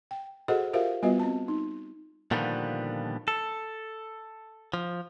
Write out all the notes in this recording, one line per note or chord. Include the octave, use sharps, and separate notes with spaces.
G5
F#4 G#4 A4 C5 D#5 F#5
F4 G4 A#4 C5 E5 F5
G3 B3 F4 F#4 B4 D#5
C4 A5
D#4
A#2 D3 D#3 F3 G3 B3
A4
F3